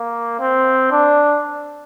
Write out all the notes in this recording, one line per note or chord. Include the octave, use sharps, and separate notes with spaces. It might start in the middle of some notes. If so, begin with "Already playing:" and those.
Already playing: A#3
C4
D4